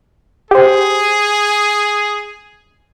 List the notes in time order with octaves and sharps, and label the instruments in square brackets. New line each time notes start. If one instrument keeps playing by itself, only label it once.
[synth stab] G4 C5 [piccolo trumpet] G#4